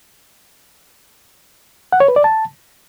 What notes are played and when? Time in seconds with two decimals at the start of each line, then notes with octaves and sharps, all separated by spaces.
1.93 F#5
2.00 C#5
2.08 B4
2.16 D5
2.24 A5